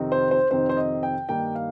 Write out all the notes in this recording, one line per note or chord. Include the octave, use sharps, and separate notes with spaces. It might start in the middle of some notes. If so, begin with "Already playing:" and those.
Already playing: F2 C3 D#3 C4 D#4
C5
C5
F2 C3 D#3 C4 D#4 C5
C5
D#5
G5
G2 D#3 A#3 D#4 G5
F5